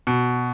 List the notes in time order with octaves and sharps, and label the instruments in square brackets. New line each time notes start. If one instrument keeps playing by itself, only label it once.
[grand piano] B2